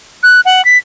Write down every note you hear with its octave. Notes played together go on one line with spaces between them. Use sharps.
F#6
F#5
B6